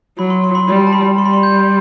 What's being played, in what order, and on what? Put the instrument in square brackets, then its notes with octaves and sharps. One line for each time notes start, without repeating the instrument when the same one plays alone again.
[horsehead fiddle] F#3 [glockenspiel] B5
[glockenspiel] C6
C6
B5
[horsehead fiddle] G3 [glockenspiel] B5
[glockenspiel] A5
B5
[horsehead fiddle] G3 [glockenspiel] C6
[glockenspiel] B5
C6
G6